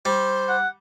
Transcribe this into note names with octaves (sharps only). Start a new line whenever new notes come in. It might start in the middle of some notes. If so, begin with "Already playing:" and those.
G3 C5
F#5